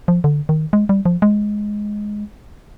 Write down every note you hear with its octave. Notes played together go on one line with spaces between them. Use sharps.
F3
D3
D#3
G#3
G3
F3
G#3